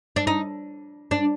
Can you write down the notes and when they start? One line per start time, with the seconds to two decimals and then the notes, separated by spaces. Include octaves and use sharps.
0.16 D4
0.27 D#4
1.11 D4